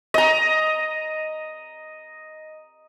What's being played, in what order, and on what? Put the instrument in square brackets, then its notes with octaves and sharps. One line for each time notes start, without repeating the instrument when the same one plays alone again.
[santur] D#5 A#5